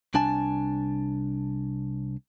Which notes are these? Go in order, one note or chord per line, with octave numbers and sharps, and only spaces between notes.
C2 D4 G#5 A5